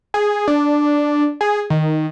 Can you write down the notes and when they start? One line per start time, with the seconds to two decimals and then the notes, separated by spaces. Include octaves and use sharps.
0.14 G#4
0.48 D4
1.41 G#4
1.70 D#3